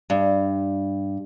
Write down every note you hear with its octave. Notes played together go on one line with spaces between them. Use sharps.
G2